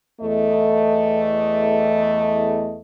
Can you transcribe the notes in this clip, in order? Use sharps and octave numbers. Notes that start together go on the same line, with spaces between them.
E2 A3 D#5